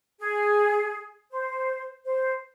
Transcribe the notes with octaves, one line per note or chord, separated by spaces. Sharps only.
G#4
C5
C5